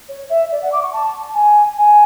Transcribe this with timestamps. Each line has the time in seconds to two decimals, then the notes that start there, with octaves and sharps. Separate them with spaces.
0.08 C#5
0.29 E5
0.51 D5
0.61 F#5
0.72 D6
0.82 C#6
0.93 A5
1.34 G#5
1.77 G#5